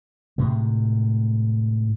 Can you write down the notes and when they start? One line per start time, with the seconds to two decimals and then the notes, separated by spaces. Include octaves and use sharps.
0.38 A2 C3 G#3